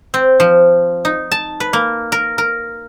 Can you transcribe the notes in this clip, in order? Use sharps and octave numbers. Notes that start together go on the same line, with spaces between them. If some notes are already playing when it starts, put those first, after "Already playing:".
C4
F3
D#4
A5
B4
A#3
A#4
A#4